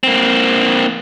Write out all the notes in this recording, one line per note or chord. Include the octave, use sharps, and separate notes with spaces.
A#3 C4